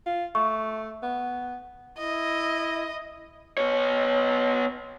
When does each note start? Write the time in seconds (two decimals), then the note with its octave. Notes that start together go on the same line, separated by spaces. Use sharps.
0.06 F4
0.35 A3 C#6
1.03 B3
1.98 E4 D#5
3.58 B3 C#5